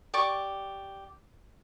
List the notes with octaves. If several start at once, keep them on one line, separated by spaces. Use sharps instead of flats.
G4 D5 C#6 D6